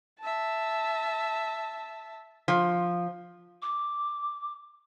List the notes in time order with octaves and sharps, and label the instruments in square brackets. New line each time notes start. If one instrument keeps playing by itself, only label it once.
[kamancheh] E5 A5
[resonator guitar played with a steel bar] F3
[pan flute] D6